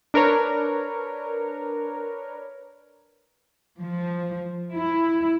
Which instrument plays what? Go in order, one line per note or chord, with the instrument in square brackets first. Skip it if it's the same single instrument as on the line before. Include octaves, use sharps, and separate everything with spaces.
[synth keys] D4 A#4 B4 C#5
[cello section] F3
E4